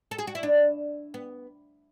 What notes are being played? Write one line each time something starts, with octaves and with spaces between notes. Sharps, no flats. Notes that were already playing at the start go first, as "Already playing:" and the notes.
A4
G#4
F#4
E4
D4
B3